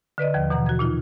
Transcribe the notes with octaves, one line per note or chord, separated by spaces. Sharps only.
D3 B4 D5 D#5
D#2 F3
B2 E3 F#5 A#5
F#4 G#6
A#2 D#4 F4